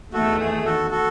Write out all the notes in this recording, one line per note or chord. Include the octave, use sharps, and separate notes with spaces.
E2 D#3 A3 F#4 A4
G#4
F#4 A4
F#4 A4